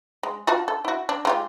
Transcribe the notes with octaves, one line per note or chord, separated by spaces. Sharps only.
G#3
F4 F#4 A5
A4
E4 F#4
D4
G#3 F4 G4